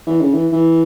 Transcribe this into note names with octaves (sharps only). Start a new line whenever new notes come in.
E3
C#3
E3
E3